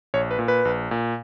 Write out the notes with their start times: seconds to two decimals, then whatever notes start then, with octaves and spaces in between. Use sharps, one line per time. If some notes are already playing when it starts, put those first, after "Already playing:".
0.14 A#1 C#5
0.31 B4
0.39 A#2
0.48 B4
0.65 A#1
0.91 A#2